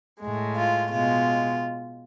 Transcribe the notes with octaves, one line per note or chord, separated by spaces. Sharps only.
A2 G#3
F4
B2 G#3 F4